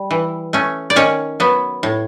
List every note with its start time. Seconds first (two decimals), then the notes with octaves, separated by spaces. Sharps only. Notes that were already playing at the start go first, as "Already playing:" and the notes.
Already playing: G3
0.11 E3
0.53 A3 C#4
0.90 D5
0.96 D#3 C#4 C#5
1.40 F#3 B3
1.83 A2